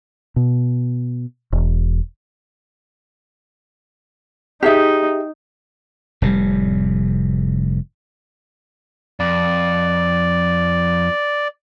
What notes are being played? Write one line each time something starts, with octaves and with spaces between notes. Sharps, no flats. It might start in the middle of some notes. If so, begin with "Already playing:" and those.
B2
E1
D#4 G4 G#4 E5
F1 A2 C3 G3
F2 D5